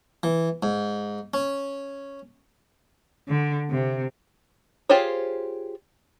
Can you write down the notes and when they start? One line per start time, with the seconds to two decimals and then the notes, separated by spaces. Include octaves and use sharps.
0.23 E3
0.63 G#2
1.34 C#4
3.28 D3
3.70 C3
4.89 F4 G4 G#4 C5 C#5